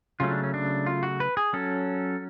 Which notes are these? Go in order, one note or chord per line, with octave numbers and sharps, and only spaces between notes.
C#3 F#3 A3 C#4 F4
D4
C#4
D4
F4
F#4
B4
G#4
F#3 C#4 A4